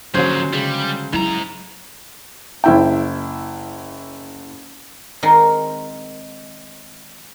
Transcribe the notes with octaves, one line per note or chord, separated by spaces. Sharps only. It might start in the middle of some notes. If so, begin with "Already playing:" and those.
D3 F3 F#3 A#3 C#4 G#4 C5
C#3 G3 G#3
G#2 F#3 E4 A#5
F#1 E4 G5
D#3 G#3 C4 D#4 A#4 C6